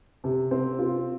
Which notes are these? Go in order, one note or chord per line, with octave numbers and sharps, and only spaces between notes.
C3
C4
F4